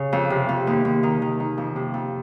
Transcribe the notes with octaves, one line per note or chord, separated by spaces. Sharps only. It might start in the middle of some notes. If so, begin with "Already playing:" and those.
Already playing: C#3
F2
C3
F2
D#2
D#2
D#3
D#3
D#3
F2
C3
F2